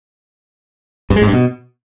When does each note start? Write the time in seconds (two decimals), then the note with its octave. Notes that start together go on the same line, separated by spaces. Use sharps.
1.10 G2
1.16 G#3
1.22 G#2
1.27 G2
1.33 B2